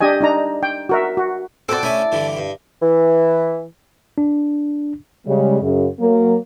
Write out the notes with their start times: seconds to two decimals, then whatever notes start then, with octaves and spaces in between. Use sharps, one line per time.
0.01 D4 G4 D#5 G#5
0.21 D4 D#4 A#5
0.63 G5
0.89 F#4 A#4 E5
1.17 F#4
1.69 B2 C4 F#4 A4 D5
1.83 A3 C#4 E4 G#5
2.12 G2 D3 E3
2.37 G2
2.82 E3
4.18 D4
5.27 C#3 G3 G#3
5.61 F#2 C#3
6.00 F#3 A#3